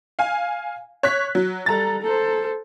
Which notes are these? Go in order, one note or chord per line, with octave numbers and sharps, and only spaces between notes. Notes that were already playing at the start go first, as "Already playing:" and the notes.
F5 G#5
C#5 F#6 B6
F#3
G3 A4 A#5 A6
A4 C5